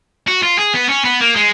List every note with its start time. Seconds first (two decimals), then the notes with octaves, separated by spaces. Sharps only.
0.27 F#4
0.43 F4
0.58 G#4
0.74 B3
0.89 C#4
1.05 B3
1.21 A#3
1.36 G#3